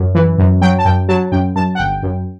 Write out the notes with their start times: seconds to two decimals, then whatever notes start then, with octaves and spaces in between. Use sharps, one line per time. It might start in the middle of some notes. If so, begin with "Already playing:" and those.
Already playing: F#2
0.15 E3
0.38 F#2
0.61 F#3 G5
0.79 A5
0.85 F#2 G5
1.09 F#3 A5
1.32 F#2 G5
1.55 F#2 A5
1.75 F#5
1.79 G1 G5
2.03 F#2